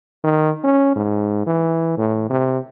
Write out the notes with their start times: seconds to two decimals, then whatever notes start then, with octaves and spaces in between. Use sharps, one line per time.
0.24 D#3
0.64 C#4
0.96 G#2
1.46 E3
1.97 A2
2.30 C3